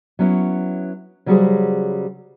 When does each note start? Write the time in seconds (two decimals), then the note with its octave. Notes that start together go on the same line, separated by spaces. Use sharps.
0.19 F#3 B3 C#4 E4
1.26 C#3 F#3 G3 F#4 G#4 C5